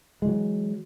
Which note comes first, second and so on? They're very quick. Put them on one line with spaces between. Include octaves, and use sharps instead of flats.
G#3 E3 F#3